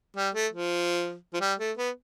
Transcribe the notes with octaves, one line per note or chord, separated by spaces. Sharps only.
G3
A3
F3
F3
G3
A3
B3